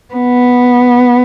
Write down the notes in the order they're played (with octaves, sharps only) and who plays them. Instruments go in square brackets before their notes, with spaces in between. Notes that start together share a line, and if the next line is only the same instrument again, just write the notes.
[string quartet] B3